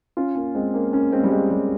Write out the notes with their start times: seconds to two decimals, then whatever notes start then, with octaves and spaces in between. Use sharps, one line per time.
0.17 C#4 F4
0.35 A#3 C#4
0.55 G#3 C4
0.74 A#3 C#4
0.93 A#3 C#4
1.12 G#3 C4
1.24 G3
1.31 G#3
1.51 G3